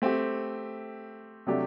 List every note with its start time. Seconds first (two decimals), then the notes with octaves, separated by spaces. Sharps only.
0.02 A3 C4 G4
1.47 C3 F#3 A3 D4 G4